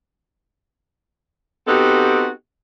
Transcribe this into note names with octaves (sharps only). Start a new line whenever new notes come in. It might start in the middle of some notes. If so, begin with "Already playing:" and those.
B3 C4 D#4 F#4 G4 A4